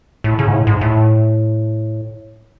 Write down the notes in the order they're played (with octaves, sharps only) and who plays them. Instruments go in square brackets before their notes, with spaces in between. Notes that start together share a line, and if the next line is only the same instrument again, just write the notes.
[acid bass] A2
C#3
G#2
A2
G#2
A2